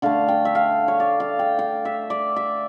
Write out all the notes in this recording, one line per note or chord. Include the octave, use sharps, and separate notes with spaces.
D3 A3 F5
G5
E5
F5
C#5
D5
F5
G5
F5
E5
D5
E5